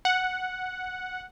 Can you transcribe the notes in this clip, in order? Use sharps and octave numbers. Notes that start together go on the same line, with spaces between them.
F#5